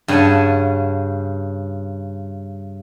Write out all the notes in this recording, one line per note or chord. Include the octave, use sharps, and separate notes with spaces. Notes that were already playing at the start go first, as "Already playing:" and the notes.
G2 C#3 F#5 G#5 A5